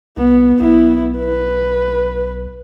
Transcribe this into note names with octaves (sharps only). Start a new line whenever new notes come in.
C2 B3
B1 B3 E4
B4